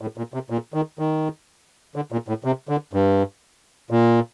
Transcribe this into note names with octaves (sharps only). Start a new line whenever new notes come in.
A2
A#2
C3
A#2
D#3
D#3
D3
A#2
A2
C3
D3
G2
A#2